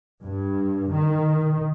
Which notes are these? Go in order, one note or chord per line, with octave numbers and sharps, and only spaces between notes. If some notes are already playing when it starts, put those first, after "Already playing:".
G2
D#3